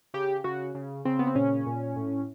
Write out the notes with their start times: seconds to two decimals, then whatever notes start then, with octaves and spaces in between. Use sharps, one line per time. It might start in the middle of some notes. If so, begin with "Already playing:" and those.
0.14 C#3 G4
0.44 C#3 F#4
0.75 C#3
1.05 C#3 C4
1.19 B3
1.27 C4
1.35 A#2 C#4
1.66 A#2
1.96 A2